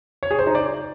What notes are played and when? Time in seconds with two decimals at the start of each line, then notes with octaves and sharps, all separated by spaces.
0.23 C#5
0.31 G#4
0.39 C5
0.47 D#4
0.55 D5